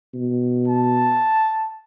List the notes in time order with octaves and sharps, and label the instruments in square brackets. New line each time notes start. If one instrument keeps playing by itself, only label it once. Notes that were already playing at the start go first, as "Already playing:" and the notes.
[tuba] B2
[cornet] A5